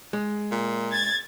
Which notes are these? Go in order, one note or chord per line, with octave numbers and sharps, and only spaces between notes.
G#3
A#2
G#6 A6